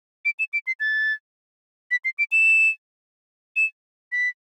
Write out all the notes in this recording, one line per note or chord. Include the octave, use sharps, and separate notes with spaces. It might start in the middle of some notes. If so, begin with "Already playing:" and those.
D7
E7
D7
C7
A6
B6
C7
D7
E7
E7
B6